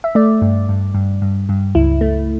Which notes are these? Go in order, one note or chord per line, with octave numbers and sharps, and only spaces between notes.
E5
A3 D5
G2
G2
G2
G2
G2
C#2 E4
A3